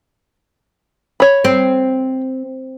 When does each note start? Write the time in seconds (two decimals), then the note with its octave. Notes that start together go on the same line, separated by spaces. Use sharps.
1.20 C#5 B5
1.45 C4